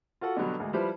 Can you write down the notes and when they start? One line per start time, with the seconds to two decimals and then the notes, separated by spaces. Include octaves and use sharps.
0.21 F4 F#4 A4 F#5
0.37 B2 D3 F#3 G3
0.60 D2 G#3
0.73 F3 G3 E4 G4 B4 C5